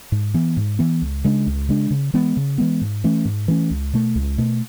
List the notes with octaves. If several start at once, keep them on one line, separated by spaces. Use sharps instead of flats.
G#2
E3 B3
G#2
E3 B3
C#2
C#3 G#3 D4
C#2
C#3 G#3 D4
C#3
E3 G#3 B3
C#3
E3 G#3 B3
G#2
E3 A3 C#4
G#2
E3 A3 C#4
C#2
B2 A3
C#2
B2 A3